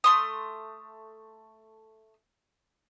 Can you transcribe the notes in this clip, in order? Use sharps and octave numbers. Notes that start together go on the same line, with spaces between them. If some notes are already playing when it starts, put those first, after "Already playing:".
A3 C6 D#6